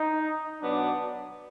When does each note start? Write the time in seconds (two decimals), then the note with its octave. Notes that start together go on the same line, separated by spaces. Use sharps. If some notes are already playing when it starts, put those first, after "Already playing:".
Already playing: D#4
0.61 B2 F#3 B3 D4